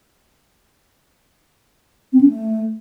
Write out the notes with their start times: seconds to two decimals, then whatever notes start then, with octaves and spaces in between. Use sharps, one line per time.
2.13 C4
2.21 C#4
2.29 A3